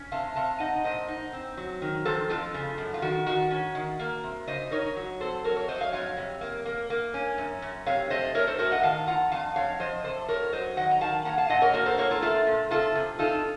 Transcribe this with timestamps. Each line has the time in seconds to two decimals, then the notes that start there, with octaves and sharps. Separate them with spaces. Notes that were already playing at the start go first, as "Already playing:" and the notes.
Already playing: C#4
0.11 C3 F5 A5
0.36 C3 F5 A5
0.60 D#4 D#5 F#5
0.84 A#2 C5 D#5
1.08 D#4
1.33 C4
1.57 F#3
1.82 D#3
2.05 F3 A4 C5
2.29 F2 F4 A4
2.54 C#3
2.78 F#2
2.94 F4
3.02 D#3 F#4
3.26 D#3 F#4
3.51 C#4
3.75 D#3
3.99 A#3
4.23 C3
4.47 C#3 C5 D#5
4.71 D#4 A#4 C#5
4.96 F#3
5.20 C4 A4 C5
5.44 F#3 A#4 C#5
5.56 A#4 C#5
5.68 F#3 C5 D#5
5.81 C#5 F5
5.93 F2 C#5 F5
6.17 C3
6.41 A#3
6.65 A#3
6.90 A#3
7.14 C#4
7.38 F#2
7.62 F#2
7.86 C3 C#5 F5
8.10 A3 C5 D#5
8.35 A3 A#4 C#5
8.47 A4 C5
8.59 A2 F#4 A#4
8.71 D#5 F#5
8.83 D#3 F5 A5
9.07 F4 F#5 A#5
9.32 F2 F5 A5
9.56 F2 C#5 F5
9.80 F3 C5 D#5
10.04 C3 A4 C5
10.28 F#3 A#4 C#5
10.52 F#3 C5 D#5
10.77 D#3 D#5 F#5
10.91 A#5
11.01 D#3 F5 A5
11.25 A#3 F#5 A#5
11.38 F5 A5
11.49 A#2 D#5 F#5
11.62 A#4 C#5
11.74 A#3 F#4 A#4
11.86 A4 C5
11.98 A#3 A#4 C#5
12.11 F4 A4
12.22 A3 F4 A4
12.47 A#2
12.71 C3 F4 A4
12.95 C3
13.19 D#4 F4 A4